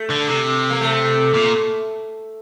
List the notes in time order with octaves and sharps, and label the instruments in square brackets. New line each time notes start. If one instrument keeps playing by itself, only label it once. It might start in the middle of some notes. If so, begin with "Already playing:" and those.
Already playing: [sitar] A3
[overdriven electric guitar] D3
C3
[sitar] A#3
A3
[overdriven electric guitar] A#2